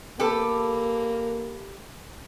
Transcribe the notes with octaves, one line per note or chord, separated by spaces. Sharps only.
A#3 G4 A4 B4